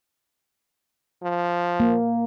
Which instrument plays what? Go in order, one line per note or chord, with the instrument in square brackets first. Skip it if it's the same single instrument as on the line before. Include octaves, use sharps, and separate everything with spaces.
[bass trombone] F3
[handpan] A#3